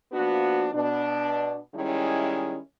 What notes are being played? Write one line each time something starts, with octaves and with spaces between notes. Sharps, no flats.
F3 A#3 B3 D4 F#4
B2 D4
D#3 G3 G#3 C#4 E4